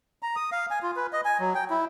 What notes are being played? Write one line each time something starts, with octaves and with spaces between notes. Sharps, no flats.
A#5
D#6
F5
G#5
F4
B4
D#5
G#5
F#3
G5
E4